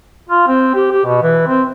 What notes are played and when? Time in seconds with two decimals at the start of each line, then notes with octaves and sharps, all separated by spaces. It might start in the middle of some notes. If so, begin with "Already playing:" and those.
0.30 F4
0.48 C4
0.75 G4
0.92 G4
1.05 B2
1.22 E3
1.48 C4